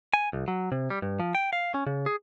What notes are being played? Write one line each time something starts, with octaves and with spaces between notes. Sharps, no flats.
G#5
C2
F#3
C3
G3
G2
F3
G5
F5
C#4
C#3
G#4